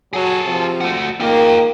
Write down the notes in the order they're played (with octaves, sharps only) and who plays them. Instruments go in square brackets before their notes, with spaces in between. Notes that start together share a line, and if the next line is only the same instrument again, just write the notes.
[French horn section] F#3 [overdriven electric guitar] G#4 A4
[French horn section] C3 F3
[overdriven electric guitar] A3 F#4
[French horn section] G#2 D#3 A#3 [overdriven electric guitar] F4 G5